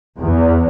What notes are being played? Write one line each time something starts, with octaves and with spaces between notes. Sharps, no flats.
E2